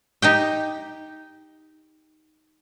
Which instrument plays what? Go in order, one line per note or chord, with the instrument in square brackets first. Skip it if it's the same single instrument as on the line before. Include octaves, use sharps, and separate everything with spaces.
[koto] D#4 G4 G5